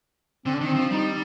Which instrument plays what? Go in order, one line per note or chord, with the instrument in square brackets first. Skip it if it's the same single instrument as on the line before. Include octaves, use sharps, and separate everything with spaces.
[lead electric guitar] D3 [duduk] C4
[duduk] D4
[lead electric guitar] D#3 [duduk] C4
[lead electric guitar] F3
[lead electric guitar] G3 [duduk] D#4